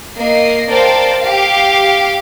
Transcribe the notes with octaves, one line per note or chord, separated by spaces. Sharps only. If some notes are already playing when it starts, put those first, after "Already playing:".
A#3 D#5 C7
A#4 C5 D5 F5 G5 A5
G4 F5